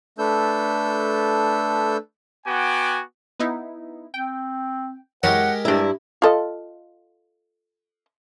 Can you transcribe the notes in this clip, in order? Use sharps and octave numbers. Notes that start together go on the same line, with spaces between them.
A3 D4 A4 B4 E6 G6
B3 F#4 G5 G#5 D6
B3 D#4 E4
C4 G5
F#2 E3 G#3 G4 A#4 C#5 F#5
G2 D4 E4 D5 A#5
F4 A4 D#5